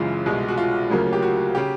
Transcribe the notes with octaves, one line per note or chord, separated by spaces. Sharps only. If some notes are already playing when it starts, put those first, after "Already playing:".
Already playing: F#1 F#2 C#3 E3 G#3 F4
C2 B2 G#3
F#4
F4
D2 C#3 F#3 A#3
G4
F#4
C#3 G4